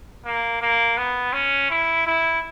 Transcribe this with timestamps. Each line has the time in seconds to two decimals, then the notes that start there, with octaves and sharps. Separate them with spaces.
0.25 A#3
0.61 A#3
0.97 B3
1.33 C#4
1.71 E4
2.07 E4